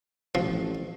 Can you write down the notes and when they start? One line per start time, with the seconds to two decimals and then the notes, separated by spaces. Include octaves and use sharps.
0.35 A1 F3